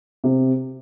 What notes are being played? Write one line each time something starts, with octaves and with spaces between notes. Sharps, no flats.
C3